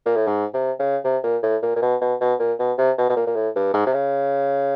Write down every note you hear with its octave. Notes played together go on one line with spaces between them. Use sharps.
A#2
A2
G#2
C3
C#3
C3
A#2
A2
A#2
A#2
B2
B2
B2
A#2
B2
C3
B2
B2
A#2
A#2
A2
G2
G#2
C3
C#3